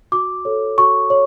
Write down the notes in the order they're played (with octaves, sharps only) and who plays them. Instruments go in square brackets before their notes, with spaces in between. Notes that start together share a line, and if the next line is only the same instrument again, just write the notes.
[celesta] F#4 D6
A4 C#5
F#4 C#6
C#5